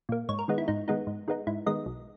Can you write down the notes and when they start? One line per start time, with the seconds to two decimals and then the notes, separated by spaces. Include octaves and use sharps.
0.09 A#2 A#3
0.29 G#2 C#5
0.39 A#4
0.48 D#3 G#3 B3 D#4
0.58 E4
0.68 G#2 D#4
0.88 D#3 G#3 B3 D#4
1.07 G#2
1.28 D#3 G#3 B3 D#4
1.47 G#2 E4
1.66 D#3 G#3 B3 D#4 D#5
1.86 B1